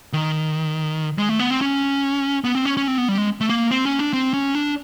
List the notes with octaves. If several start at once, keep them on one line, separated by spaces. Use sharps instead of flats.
D#3
G#3
A3
B3
C4
C#4
B3
C4
C#4
C#4
C4
B3
G3
G#3
A3
A#3
C4
C#4
D4
C4
C#4
D4